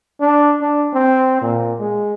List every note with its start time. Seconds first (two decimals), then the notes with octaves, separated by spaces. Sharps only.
0.21 D4
0.62 D4
0.94 C4
1.42 A#2
1.80 G#3